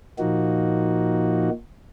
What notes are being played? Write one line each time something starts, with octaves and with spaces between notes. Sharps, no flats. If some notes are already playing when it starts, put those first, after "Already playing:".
A#2 F3 A#3 D#4 F#4